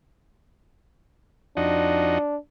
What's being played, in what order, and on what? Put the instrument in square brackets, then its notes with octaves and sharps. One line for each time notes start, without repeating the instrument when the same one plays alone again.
[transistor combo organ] F2 D#4 F#4 [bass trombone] D4